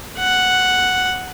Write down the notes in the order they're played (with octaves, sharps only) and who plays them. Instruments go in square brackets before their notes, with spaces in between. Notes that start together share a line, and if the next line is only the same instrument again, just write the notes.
[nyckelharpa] F#5